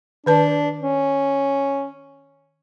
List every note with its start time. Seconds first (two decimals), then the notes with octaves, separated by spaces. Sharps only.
0.26 D#3 D4 B4 A5
0.81 C#4